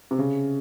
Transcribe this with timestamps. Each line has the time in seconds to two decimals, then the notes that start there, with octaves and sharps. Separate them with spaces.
0.11 C3
0.19 C#3